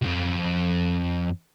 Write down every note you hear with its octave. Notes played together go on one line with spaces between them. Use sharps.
C2 F2